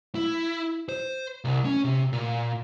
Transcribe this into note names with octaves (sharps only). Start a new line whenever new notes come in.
E4
C5
C2
C#4
C3
A#2